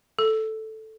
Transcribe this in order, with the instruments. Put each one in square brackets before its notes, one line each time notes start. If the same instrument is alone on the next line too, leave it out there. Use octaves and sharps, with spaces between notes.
[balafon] A4